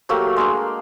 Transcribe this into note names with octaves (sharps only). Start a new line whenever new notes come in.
F#3 A3 A#3 G4
G#3 A#3 D4